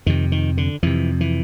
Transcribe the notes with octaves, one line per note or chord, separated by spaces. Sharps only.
F2 C3 D#3
D#3
D3
F2 C3 E3
E3